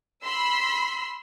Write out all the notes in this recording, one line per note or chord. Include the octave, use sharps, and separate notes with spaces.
B5 C6 E6 B6